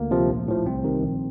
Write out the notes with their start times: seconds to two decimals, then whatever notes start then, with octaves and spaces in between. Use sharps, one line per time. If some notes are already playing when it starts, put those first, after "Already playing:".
Already playing: D2 A#3
0.11 C3 F3
0.29 A#1
0.48 A2 F3
0.66 C2 C4
0.84 C3 D#3
1.03 A#1